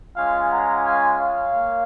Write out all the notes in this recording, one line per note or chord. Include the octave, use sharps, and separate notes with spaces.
G#3 C#4 F4 F5 G#5
F#5 A#5
F5 G#5
C#5 F5
A#3